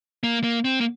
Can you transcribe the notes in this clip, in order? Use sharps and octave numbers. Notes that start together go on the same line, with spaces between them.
A#3
A#3
C4
A#3